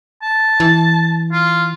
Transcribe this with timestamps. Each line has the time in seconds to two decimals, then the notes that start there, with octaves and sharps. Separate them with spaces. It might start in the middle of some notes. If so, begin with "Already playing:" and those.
0.23 A5
0.60 E3
1.32 F4